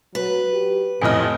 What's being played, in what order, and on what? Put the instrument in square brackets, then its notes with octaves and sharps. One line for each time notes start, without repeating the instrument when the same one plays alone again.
[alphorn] F#3 [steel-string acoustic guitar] B4
[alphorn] G4
[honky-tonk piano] A1 F2 D#5 [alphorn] A2 [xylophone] G#5 F6